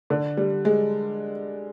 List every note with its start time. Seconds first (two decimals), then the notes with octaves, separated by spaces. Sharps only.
0.10 D3
0.37 G3
0.65 G#3